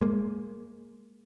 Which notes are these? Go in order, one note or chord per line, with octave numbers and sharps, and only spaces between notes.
G#3 A#3